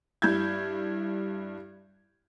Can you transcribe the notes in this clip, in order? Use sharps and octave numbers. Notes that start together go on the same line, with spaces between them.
G2 E4 G6 G#6